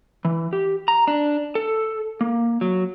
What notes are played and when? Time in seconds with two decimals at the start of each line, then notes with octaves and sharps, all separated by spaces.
0.25 E3
0.53 G4
0.88 A#5
1.08 D4
1.55 A4
2.21 A#3
2.61 F#3